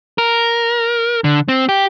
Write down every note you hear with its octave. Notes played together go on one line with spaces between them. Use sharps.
A#4
D3
C4
G4